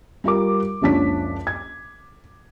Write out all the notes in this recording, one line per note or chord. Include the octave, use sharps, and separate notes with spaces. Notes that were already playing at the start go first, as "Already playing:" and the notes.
G3 F4 A#4 D6
F#1 C#2 F3 D4 C#5 B6
G#6